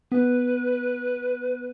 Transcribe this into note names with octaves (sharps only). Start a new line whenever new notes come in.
B3 B4